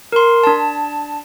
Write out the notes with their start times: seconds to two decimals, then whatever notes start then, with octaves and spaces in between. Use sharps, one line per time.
0.12 A#4 C6
0.44 D4 A5